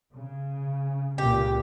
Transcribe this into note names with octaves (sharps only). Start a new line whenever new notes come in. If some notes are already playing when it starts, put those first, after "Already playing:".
C#3
C#2 A#2 C#3 G4